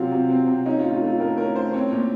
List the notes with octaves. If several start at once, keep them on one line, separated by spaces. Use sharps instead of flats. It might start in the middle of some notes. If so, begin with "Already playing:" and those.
Already playing: C3 F#3 C4 F4
C3
C4
C3
C#4 D#4
F4
A2
F4
A3
F4
A2 A#4
C#4 A#4
A2 C5
C4 C#5
A#2